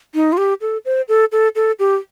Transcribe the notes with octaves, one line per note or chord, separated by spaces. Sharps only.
D#4
F4
G4
A4
C5
A4
A4
A4
G4